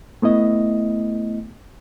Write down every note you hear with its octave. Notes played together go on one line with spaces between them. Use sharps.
A3 B3 E4 D#5